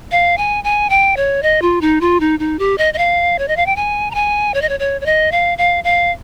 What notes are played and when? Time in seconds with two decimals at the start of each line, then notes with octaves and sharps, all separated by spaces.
0.11 F5
0.38 G#5
0.64 G#5
0.90 G5
1.17 C#5
1.43 D#5
1.62 F4
1.81 D#4
2.01 F4
2.20 D#4
2.39 D#4
2.59 G4
2.78 D#5
2.94 D#5
2.98 F5
3.39 C#5
3.48 D#5
3.56 F5
3.66 G5
3.76 G#5
4.11 A#5
4.15 G#5
4.54 C#5
4.62 D#5
4.69 C#5
4.80 C#5
5.01 C#5
5.06 D#5
5.32 F5
5.58 F5
5.84 F5